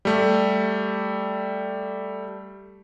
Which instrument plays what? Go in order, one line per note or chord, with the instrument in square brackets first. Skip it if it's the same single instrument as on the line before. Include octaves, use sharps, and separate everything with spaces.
[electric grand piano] G3 A3